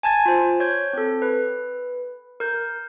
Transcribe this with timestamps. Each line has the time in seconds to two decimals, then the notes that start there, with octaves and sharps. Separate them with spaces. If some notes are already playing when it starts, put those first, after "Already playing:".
0.03 G#5 A5 G#6 A6
0.26 F4 C5
0.60 C#5 G6 G#6
0.93 C4 A4
1.22 B4
2.40 A#4 G6